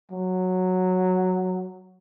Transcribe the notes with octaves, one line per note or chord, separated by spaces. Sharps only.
F#3